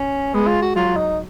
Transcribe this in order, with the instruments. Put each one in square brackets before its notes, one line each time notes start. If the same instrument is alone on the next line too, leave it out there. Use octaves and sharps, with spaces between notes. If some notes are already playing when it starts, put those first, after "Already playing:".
Already playing: [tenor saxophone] C#4
[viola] G#3 [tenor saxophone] B3
[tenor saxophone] F4
F#4
[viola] F#3 [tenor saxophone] F4
[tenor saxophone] D#4